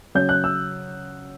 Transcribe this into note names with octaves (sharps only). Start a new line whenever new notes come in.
C#3 F#3 C#4 G6
F#6
E6